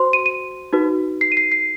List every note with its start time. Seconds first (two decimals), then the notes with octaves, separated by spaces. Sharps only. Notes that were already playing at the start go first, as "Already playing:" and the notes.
Already playing: F#4 C5 C6
0.13 D#7
0.26 D#7
0.73 D#4 F#4 B4
1.21 C7
1.32 D#7
1.37 C7
1.52 C7